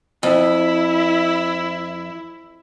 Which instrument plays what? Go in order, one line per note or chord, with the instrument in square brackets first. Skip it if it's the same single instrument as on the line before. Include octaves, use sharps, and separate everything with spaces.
[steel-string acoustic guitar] F2 [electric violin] E4